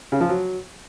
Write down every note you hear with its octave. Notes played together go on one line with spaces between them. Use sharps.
C#3
F3
F#3